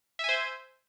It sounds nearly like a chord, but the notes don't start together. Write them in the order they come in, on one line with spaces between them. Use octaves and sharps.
E5 G#5 C5